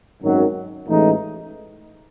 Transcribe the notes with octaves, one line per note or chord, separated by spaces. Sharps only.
G#1 F#2 D#3 F#3
A1 A2 E3 G#3 D#4